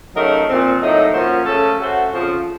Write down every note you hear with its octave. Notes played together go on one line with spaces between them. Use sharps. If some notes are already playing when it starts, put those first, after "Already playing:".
C#3 F#3 A3 D#4 A#4
A#2 F3 C4
A2 F#3 A#3 D#4
F3 A#3 C#4 F#4 C5
C#3 A3 C#4 A4
A3 C#4 F#4 C5
F2 C#3 F3